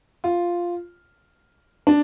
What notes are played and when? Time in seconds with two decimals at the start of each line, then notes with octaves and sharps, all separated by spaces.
0.24 F4
1.87 D4